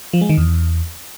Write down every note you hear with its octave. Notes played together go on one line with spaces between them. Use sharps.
F3
G#3
D#3
E2